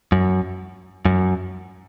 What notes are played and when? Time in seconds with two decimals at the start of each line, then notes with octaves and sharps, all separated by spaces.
0.12 F#2
1.05 F#2